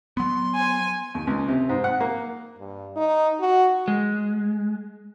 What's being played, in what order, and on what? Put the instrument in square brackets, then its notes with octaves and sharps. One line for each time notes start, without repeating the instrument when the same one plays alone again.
[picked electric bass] F#3 B3 [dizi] C6
[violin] G#5
[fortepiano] D#2
C#2
C3
G#2
F#5
A#3
[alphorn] G2
D#4
F#4
[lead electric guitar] G#3